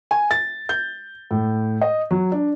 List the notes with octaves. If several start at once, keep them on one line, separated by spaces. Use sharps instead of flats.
G#5
A6
G6
A2
D#5
F#3
D4